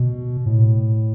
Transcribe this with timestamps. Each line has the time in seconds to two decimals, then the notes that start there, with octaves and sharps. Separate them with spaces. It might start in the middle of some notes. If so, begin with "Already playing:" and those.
Already playing: B2
0.46 A2